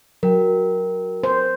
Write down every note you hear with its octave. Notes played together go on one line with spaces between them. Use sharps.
F#3 A#4 G5
C5